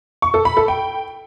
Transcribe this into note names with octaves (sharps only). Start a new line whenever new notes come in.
C#6
A4
B5
A4
G5